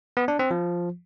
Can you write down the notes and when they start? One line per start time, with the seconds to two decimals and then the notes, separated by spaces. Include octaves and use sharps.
0.17 B3
0.28 D4
0.39 C4
0.51 F3